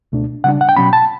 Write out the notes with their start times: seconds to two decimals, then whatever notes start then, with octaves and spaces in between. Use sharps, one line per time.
0.12 C#2 B2 A3 D4
0.44 C#3 G3 D4 F#5
0.61 F#5
0.69 G5
0.76 B2 F#3 C#4 B5
0.93 A5